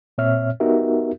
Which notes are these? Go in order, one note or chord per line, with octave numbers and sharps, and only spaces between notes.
A#2 C4 C#5 E5 F6
B3 D#4 F#4 G4 A#4 E5